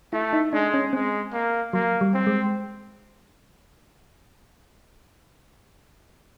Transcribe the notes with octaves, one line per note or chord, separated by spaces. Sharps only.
A3 E4
D#4
G#3 D4
C#4
G#3 C4
A#3
F#3 A#3
G3
C4
G#3